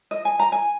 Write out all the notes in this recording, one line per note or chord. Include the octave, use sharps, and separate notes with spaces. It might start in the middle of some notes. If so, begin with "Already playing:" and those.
D#5
G#5
A#5
G#5